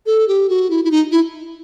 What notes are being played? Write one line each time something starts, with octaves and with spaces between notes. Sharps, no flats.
A4
G4
F#4
E4
E4
D#4
E4